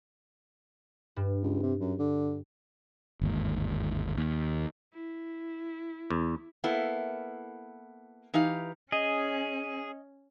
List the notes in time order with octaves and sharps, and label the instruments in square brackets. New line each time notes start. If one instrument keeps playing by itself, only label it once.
[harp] G2
[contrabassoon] C#2
C3
F#2
D3
[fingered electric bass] G1 D#2 G#2
D#2
[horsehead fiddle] E4
[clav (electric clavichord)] E2
[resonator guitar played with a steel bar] A#3 B3 E4 A4
E3 D#4 G4 B4 F5
[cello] C#4 [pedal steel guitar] G#4 [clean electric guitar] D#5